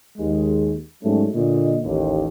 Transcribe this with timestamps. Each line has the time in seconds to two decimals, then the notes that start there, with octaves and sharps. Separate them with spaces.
0.18 D#2 G#3
1.04 G#2 F#3 G3 A3 C#4
1.35 A#2 D3 D#5
1.83 A1 D#2